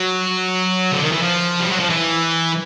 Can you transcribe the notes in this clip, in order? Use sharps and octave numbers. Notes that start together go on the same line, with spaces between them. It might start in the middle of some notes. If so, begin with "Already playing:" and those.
Already playing: F#3
D3
D#3
E3
F3
G3
F#3
F3
E3